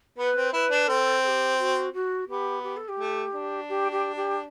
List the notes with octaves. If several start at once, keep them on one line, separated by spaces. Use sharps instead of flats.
B3 B4
C4
E4 B4
D4
C4 A4
A4
G4
F#4
F#4
B3 G4
G4
A4
G4
A3
D4
G4
G4
G4